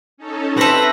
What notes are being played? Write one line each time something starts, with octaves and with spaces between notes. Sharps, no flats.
C#4 D#4 A4
C4 G4 A4 B4 E5 A#6